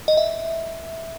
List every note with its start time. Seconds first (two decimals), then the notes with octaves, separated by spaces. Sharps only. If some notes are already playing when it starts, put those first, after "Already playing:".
0.08 D#5
0.17 E5